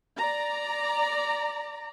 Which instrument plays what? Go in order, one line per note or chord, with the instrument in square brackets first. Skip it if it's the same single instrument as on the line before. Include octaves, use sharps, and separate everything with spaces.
[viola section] D5 A#5